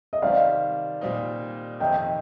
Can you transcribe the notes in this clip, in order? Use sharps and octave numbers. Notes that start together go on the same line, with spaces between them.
D#5
C3 D#3 G3 C4 D5 F5
A#2 G3 C4 D#4
F2 C3 D#3 D#5 G5